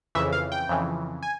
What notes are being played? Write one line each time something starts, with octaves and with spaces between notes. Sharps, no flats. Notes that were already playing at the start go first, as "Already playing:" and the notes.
F2 C#3 E3 E5
F5
G5
F2 C#3 E3
G#5